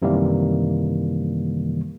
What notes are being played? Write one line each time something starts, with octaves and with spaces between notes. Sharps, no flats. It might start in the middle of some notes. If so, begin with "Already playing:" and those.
F#2 C3 D#3 E3 G3 A#3